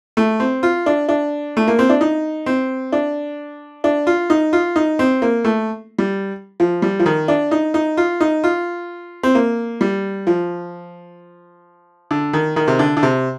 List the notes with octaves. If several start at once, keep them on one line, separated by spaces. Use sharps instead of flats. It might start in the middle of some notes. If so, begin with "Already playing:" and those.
A3
C4
F4
D4
D4
A3
A#3
C4
D4
D#4
C4
D4
D4
F4
D#4
F4
D#4
C4
A#3
A3
G3
F3
G3
F3
D#3
D4
D#4
D#4
F4
D#4
F4
C4
A#3
G3
F3
D3
D#3
D#3
C3
D3
D3
C3